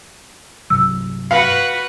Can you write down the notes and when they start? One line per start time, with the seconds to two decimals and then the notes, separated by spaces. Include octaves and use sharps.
0.70 G2 C3 F#3 E6
1.31 F#4 B4 F5